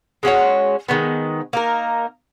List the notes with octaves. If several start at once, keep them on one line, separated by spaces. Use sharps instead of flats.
G#3 C#4 F#4 C#5
D#3 G#3 B3
A#3 D#4 A#4